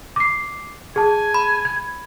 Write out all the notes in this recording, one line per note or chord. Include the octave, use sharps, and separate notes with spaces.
D6 C7
G#4 G#5 A5
B5
G#6